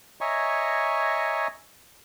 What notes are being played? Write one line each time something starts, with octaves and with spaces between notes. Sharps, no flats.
C#5 D#5 E5 G#5 A#5 C#6